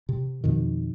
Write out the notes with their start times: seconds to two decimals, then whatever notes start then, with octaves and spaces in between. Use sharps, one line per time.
0.09 C3
0.44 F2 B2 D#3